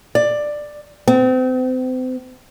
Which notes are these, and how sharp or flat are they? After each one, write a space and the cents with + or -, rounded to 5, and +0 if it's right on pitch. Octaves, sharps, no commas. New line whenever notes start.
D5 +10
C4 -35